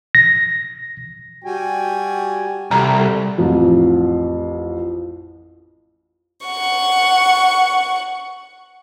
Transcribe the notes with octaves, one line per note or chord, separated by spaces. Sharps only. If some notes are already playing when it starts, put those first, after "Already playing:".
A#6
G3 F#4 G5 G#5
C2 F#4 G4 A4 A#5
A1 F2
F#5 C#6